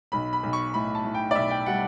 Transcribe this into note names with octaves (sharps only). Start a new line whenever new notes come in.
B1 B5
B5
B1
C#6
A2 B5
A5
A2
G5
D5
B1 E5
G5
G3 F#5